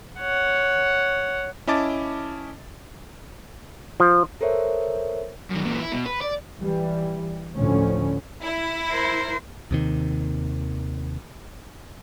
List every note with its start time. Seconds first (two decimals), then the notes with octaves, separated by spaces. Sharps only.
0.20 C#5 F#5
1.67 C#4 E4 D#5 A5 D6 A6
4.00 F3
4.41 A4 A#4 C5 C#5 E5
5.51 F#2 D#3
5.65 A#2 E3
5.80 E4
5.92 B2
6.06 B4
6.22 D5
6.60 E3 G3
7.56 D2 A2 D3 F3 C#4
8.42 E4
8.91 A#4 C5
9.71 D#2 C3 D#3